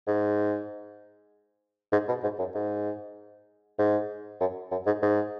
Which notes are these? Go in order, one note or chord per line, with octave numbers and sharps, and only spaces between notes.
G#2
G#2
B2
G#2
F#2
G#2
G#2
F#2
F#2
G#2
G#2